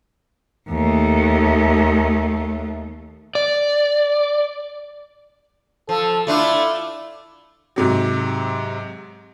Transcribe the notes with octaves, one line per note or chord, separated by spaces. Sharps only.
D#2 A3
D5
F3 A4
A3 D4 E4 F4
G#2 C3 F#3